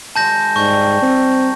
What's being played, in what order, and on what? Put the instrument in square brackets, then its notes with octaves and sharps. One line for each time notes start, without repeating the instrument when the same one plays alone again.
[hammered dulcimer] D#3 G#3 F#4 [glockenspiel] A5 G6 A#6
[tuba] G#2 [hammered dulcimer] G3 D#4 [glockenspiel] C#6 G6
[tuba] C4